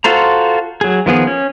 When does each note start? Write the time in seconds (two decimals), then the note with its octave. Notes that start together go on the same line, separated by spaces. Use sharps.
0.04 F4 F#4 A4 C5 A#5
0.81 F#3 G#4
1.06 D#3 F3 B3 G#4
1.27 C#4